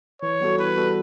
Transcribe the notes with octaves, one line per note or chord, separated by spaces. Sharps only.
E3 C#5
G3 B3 F#4 A4
E3 B4
G3 B3 F#4 A4